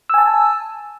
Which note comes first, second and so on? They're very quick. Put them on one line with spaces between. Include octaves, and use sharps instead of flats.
E6 G#5 A5